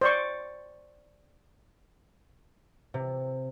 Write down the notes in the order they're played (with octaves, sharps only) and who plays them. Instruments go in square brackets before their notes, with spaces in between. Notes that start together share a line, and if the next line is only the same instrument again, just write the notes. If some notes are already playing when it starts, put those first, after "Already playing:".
[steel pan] C5 D5 C#6
[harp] C3